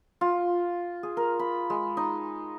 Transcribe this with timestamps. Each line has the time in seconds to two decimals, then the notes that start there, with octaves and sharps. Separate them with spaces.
0.21 F4
1.03 G#4
1.17 A#4
1.39 B5
1.70 G#3
1.97 D#4